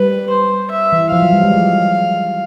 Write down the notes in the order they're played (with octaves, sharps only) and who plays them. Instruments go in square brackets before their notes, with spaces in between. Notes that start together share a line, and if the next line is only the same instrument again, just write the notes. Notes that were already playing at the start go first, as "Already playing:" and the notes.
Already playing: [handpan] G3 [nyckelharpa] B4
[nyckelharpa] C5
E5
[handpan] E3
[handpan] F3 [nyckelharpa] F5
[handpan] F#3
G3
G#3
F#3